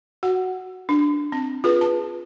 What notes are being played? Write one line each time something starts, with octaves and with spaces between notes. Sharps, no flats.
F#4 F#5
D4
C4
F4 G#4 B4
A5